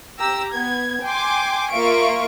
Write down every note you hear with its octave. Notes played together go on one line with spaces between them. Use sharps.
G4 A#5 E6
B3 G#6
G5 G#5 C6 D6
A#3 F4 E5 F5 C#6 D7